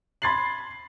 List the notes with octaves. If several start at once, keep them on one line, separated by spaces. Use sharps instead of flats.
B5 C6 G#6 A6 C7 F#7